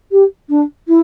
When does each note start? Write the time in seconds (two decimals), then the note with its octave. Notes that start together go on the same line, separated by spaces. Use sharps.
0.11 G4
0.49 D4
0.87 E4